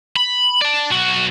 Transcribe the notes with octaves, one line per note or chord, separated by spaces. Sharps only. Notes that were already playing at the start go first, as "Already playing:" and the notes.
B5
D5 A5
B1 F#4